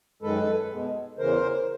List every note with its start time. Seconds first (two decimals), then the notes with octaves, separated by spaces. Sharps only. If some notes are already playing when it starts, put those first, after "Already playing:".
0.22 F#2 D#3 G#3 A4 B4
0.70 B2 G#3
1.18 E2 C#3 E3 A#4 C5